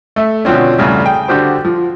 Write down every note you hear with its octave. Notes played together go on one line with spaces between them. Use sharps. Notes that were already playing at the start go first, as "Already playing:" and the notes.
A3 E5
B2 D3 F3 C4 C#4
E2 G2 C#3 A3
G#4 G5
D3 D4 F#4 G4 C5
F3